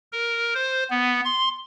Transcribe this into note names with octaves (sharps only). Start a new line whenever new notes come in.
A#4
C5
B3
C6